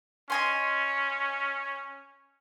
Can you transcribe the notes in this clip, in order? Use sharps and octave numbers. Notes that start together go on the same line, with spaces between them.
C#4 D#5 G#5 C6